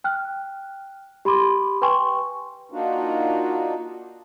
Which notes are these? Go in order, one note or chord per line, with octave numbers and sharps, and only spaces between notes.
G5 F6 F#6
G4 B5 C6 D6
B4 G5 G#5 C6 C#6
A#3 D4 D#4 F4 F#4